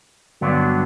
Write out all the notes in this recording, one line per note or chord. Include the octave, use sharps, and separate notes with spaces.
G2 D3 F#3 B3 D4